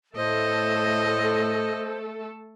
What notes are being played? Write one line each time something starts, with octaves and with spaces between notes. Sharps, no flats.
A2 A3 A4 C5 D#5